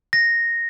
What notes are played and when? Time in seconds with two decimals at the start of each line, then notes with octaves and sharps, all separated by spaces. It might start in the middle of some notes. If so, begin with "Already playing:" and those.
0.13 A#6